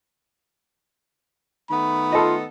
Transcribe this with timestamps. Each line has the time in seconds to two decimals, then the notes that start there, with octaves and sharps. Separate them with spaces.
1.70 D#3 A3 B3 B5
2.12 F4 A4 D#5